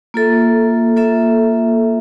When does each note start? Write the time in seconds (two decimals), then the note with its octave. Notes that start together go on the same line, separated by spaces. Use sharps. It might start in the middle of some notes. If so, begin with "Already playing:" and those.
0.14 A#3 F4 A4 E5
0.96 A#3 F4 A4 E5